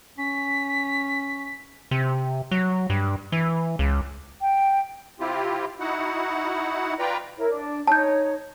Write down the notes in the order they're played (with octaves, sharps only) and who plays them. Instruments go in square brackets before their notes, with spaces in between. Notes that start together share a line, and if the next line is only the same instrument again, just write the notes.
[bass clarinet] C#4 [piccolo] B6
[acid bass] C3
F#3
G2
E3
C#2
[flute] G5
[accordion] C3 C4 E4 F4 G4
D#4 E4 F#4 F#5
F4 B4 D5 G5 A#5
[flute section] E4 A#4 C#5
D4
[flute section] D#4 C#5 [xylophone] A5 G6